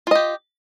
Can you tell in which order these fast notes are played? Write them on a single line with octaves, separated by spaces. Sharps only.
F4 D#5 G4